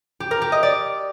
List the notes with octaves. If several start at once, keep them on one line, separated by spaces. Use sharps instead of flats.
G4
A#4
G4
D#5
D5